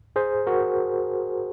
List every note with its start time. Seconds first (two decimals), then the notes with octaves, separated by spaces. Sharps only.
0.16 G#4 C5
0.47 F#4 A#4